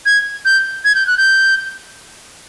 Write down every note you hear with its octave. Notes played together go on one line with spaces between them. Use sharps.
G#6
G6
G#6
G6
F#6
G6